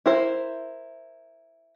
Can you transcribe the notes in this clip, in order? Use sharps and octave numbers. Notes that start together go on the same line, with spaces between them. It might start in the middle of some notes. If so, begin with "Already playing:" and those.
E4 A#4 C5